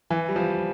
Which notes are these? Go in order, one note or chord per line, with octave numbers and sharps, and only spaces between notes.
E3
G3
F3